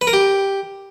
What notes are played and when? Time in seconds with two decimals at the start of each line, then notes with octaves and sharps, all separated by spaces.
0.01 B4
0.07 A#4
0.13 G4